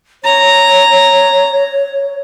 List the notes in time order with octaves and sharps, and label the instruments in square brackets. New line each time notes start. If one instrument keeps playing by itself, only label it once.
[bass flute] C#5 [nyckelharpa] A#5